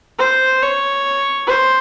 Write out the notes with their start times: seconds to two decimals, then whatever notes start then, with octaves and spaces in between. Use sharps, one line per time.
0.19 C5
0.62 C#5
1.47 C5